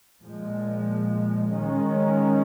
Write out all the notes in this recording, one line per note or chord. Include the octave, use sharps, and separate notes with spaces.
A#2 F3 G#3
D#3 G#3 C#4